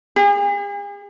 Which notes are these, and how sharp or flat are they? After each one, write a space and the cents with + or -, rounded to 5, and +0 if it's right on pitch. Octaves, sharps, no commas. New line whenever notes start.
G#4 -45